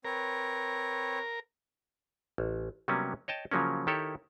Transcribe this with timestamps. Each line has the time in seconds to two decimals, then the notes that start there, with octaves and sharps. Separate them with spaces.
0.05 C4 A#4 B4 C#5
2.38 A1
2.88 C3 F#3 G3 A#3 B3 C#4
3.28 C#5 D#5 G5 A5
3.51 C#3 F3 F#3 A#3 C#4
3.87 D#3 E4 G4 A4 A#4 C#5